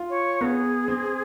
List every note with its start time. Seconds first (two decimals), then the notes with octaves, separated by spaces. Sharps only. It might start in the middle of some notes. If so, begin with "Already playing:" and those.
Already playing: F4
0.10 C#5
0.41 B3 A#4
0.45 G#4
0.88 C4